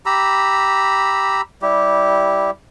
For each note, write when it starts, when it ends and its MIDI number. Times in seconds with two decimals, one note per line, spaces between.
0.06 1.41 67
0.06 1.41 82
0.06 1.41 83
0.06 1.41 88
1.62 2.51 55
1.62 2.51 64
1.62 2.51 67